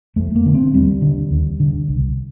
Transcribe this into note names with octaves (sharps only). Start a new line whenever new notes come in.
F2 A3
A#3
D3
C4
D#2 G3
D3
D#2
D3
C2